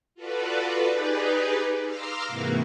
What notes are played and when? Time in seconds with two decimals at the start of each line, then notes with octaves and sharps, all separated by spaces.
0.15 F4 F#4 A4 B4 D5
0.88 D#4 G4 G#4 B4 D5
1.84 F5 A#5 C6 D6 E6 F6
2.27 G#2 C3 E3 A#3 F#4